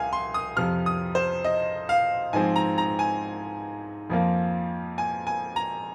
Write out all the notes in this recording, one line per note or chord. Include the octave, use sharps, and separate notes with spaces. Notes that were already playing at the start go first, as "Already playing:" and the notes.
Already playing: C2 F5 G#5
C6
D#6
F2 C3 F3 F6
D#6
C5
D#5
F5
G#2 F3 C4 G#5
A#5
A#5
G#5
F2 F3 A#3
G#5
G#5
A#5